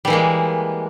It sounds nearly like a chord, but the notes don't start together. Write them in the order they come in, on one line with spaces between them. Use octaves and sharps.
G3 E3 A#3 G#3